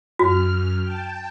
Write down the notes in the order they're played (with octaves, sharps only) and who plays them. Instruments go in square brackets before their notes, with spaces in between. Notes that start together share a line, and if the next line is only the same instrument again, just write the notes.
[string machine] F#2 F6 [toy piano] F#4
[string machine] G5 A5